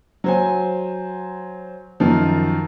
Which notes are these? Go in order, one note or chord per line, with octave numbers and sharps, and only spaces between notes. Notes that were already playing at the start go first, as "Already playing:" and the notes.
F#3 C5 G#5
F#2 D#3 F3